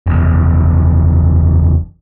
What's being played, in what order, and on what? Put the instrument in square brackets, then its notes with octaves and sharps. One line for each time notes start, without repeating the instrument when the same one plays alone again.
[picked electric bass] F#1 E2